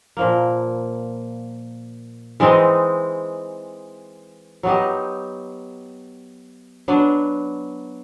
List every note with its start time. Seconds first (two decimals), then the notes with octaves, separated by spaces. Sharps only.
0.17 A#2 F3 A#3
2.40 E3 G#3 C4 D#4
4.63 F#3 B3 D#4 G4
6.88 F#3 B3 D4